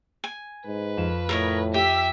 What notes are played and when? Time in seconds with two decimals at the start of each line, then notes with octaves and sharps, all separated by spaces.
0.24 G#5
0.67 G#2 B4
0.97 F2 E7
1.29 A2 A#4 C#5 D#5
1.74 G4 E5 B6